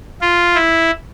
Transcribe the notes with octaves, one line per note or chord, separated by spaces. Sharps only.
F4
E4